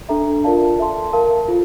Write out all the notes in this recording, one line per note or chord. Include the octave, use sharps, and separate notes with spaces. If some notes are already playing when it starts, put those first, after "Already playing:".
D4 A4 E5 A#5
F4 A#4 D5 F5 A5
A4 E5 A5 C6
A#4 F5 A5
F4 A4 C5